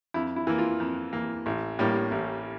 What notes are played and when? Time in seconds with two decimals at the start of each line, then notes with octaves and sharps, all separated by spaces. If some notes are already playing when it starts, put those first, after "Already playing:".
0.14 F2 E4
0.36 E4
0.47 E3 A#3
0.58 F4
0.80 F2
1.13 E3 A#3
1.46 A1
1.79 A2 G3 A#3
2.11 A1